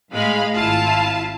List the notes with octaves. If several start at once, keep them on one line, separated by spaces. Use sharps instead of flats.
A2 G#3 F5 B5
G#1 E4 F4 F5 A5